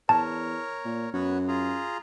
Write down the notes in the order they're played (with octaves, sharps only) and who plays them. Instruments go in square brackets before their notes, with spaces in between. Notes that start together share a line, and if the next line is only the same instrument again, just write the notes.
[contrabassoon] E2 [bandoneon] A#4 C#5 [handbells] A5
[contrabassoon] A#2
[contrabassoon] F#2 [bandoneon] B3 F#4 C#5
[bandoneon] F4 G#4 A#5